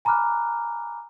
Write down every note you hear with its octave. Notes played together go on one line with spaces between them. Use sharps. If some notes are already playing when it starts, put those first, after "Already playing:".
G#5 A#5 B5 D6 F6 F#6